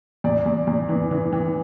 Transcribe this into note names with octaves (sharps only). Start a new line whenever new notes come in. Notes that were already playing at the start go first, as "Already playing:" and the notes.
E2 D5
E2
E2
E3
E3
E3